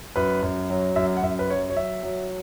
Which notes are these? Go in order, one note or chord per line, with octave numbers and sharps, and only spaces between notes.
F#2 B4
F#2
F#3
F#2 E5
F#5
F#2 E5
B4
F#3 C#5
C#5
F#3 E5
F#3